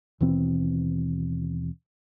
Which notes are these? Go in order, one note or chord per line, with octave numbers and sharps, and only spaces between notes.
D#2 B2 E3 C4